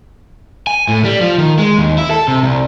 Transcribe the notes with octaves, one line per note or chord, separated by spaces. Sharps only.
G#5
A2
G3
F3
D#3
G#3
D#2
E4
A4
C3
C2